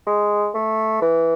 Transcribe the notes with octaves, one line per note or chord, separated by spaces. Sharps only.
G#3
A3
E3